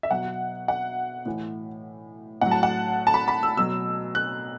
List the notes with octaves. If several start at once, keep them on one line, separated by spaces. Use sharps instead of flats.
E5
B2 F#3 F#5
F#5
A2 E3
A2 F#3 F#5
A5
F#5
A5
B5
B5
E6
B2 F#3 E6
F#6